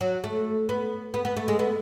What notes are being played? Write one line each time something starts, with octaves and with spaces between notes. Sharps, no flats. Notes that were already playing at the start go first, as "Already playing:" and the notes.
F#3
A3
B3
B3
B3
A3
G#3
B3